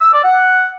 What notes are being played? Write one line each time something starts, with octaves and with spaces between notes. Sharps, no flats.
E6
D5
F#5